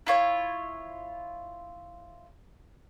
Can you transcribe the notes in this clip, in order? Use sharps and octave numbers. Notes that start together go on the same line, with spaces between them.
E4 F4 C#5